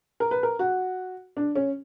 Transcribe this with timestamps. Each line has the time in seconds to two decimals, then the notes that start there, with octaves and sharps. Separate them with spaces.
0.20 A#4
0.31 B4
0.43 A#4
0.59 F#4
1.37 D4
1.56 C#4